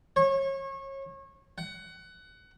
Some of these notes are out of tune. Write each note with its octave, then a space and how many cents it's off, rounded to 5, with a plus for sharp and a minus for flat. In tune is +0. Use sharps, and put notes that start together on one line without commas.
C#5 -30
F#5 +20